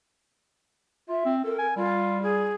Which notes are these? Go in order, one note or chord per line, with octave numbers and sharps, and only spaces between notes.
F4 E5
C4
A4 A#4
G#5
G3 F4
G#4